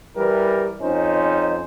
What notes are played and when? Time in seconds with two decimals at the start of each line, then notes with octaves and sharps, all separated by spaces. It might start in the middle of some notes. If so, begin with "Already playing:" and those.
0.17 E3 G3 A#4
0.81 F2 C#4 D#4 C5